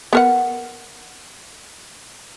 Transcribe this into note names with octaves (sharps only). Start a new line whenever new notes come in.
B3 A#4 F#5